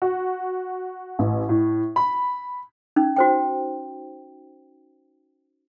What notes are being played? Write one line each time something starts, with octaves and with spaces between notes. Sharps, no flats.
F#4
A1
A2
B5
C#4 D#4
F#4 C5 G5